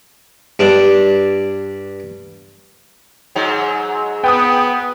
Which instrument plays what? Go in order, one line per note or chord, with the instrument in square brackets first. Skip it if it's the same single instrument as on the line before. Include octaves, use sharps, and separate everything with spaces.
[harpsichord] G2 D4
[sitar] G#2 F#3
[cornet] B3 [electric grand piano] G5 D#6